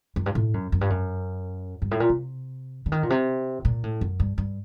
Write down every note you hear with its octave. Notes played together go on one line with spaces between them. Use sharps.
F#2
G2
A2
F#2
F#2
G2
F#2
G2
A2
A#2
C3
D3
D#3
A#2
C3
A#2
A2
F#2
G2
G2